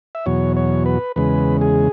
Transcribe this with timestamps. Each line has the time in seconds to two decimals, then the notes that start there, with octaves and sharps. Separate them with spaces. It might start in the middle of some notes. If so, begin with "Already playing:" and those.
0.15 E5
0.26 E2 B2 F#3 C#5
0.57 C#5
0.86 B4
1.16 E2 C#3 G#3 B4
1.61 G#4